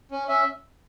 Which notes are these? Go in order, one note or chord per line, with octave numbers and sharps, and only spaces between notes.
C#4
C#4 E5